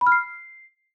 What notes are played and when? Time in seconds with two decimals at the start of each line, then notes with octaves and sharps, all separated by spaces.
0.01 B5
0.07 F6
0.12 C7